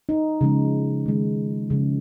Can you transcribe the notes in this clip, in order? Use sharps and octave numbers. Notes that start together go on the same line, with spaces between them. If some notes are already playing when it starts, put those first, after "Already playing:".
D#4
C#3 F3 G#3
D#3 G#3
C#3 F3 G#3